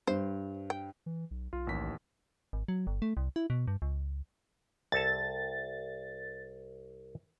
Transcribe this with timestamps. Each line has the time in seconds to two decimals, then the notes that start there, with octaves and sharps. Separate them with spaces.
0.07 G2 C5
0.70 G5
1.06 E3
1.31 B1
1.53 B1 F4
1.67 A1 D#2 B6
2.53 G#1
2.68 F#3
2.87 G1
3.02 A3
3.17 C2
3.36 E4
3.50 B2
3.68 G2
3.82 C#2
4.92 C2 A4 A5 A6